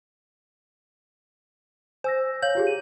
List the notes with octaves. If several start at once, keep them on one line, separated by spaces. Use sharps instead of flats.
C5 G#5 E6 A#6
C#5 F5 G6 F#7
F4 G4 G#4
D#7